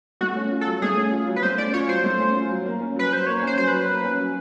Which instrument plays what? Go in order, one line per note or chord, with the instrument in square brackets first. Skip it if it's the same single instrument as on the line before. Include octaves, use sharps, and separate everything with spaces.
[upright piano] A3 [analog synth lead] F#4
[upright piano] C#4
F4
[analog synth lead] A4
[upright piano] F#3
[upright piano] A3 [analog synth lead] G#4
[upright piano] C#4
F4
F#3
[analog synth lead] B4
[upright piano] A3 [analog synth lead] C5
[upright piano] C#4 [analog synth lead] D5
[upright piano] F4 [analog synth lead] C#5
[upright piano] F#3 [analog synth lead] C5
[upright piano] A3
C#4
F4
F#3
A#3
C#4
[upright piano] F#3 [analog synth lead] B4
[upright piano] F#3 [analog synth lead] C5
[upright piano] A#3 [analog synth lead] C#5
[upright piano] C#4
[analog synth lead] C5
[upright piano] F#3 [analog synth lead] C5
[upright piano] F#3 [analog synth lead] B4
[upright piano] A#3
C#4
F#3